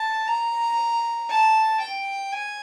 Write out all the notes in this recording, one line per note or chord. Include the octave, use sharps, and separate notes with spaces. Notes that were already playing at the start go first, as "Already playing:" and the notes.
Already playing: A5
A#5
A5
G5
G#5